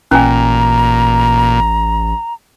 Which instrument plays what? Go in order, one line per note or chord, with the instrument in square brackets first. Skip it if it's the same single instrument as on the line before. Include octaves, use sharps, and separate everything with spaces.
[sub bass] A1 [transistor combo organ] A#2 [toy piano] C#4 G#5 [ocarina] A#5